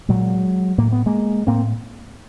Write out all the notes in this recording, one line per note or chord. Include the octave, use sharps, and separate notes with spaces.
A#2 F#3 G#3
A2 A#3
B3
G#3 A#3
A2 A#3 C4